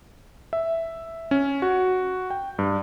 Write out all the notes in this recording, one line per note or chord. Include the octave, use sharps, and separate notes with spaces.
E5
C#4
F#4
G5
G2